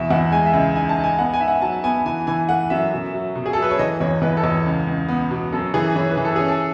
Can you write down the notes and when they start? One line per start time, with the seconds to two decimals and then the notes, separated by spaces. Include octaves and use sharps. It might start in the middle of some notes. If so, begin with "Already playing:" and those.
Already playing: E2 B2 E5
0.11 E2 F#5
0.32 G#3 G#5
0.46 E5
0.53 C#2
0.75 D#4 G#5
0.89 A5
0.97 D#4
1.04 G#5
1.19 B3 F#5
1.34 G#5
1.40 G#2 E5
1.48 F#5
1.62 F#3 A5
1.83 B3 G#5
2.05 E3 G#5
2.27 E3 G#5
2.49 A3 F#5
2.70 F#2 E5
2.93 B2
3.14 F#3
3.35 B2
3.46 G#4
3.53 F#3 A4
3.62 B4
3.71 C#5
3.79 E3 D#5
4.00 E2 C#5
4.22 E2 B4
4.37 A4
4.44 E2
4.66 C#2
4.87 C#2
5.08 B3
5.31 B2
5.52 F#2 A4
5.74 E3 G#4
5.95 E3 C#5
6.10 B4
6.17 E3
6.25 A4
6.36 C#4 G#4
6.48 A4